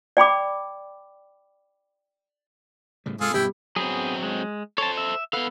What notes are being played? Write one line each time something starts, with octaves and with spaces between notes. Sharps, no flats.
D5 G5 B5 D6
A2 C#3 G3
G#2 C3 G#3 F4 G#4 A4
G2 B2 G3 B3 E4 G5
F#3 B3 C4 G#4
G#3
A4 C5 C#5 A5
E5
B3 A4 B4 F5 F#5